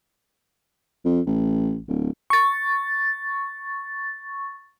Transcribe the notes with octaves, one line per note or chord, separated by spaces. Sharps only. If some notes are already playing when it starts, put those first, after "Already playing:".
F2
A1
D1
C#6 A6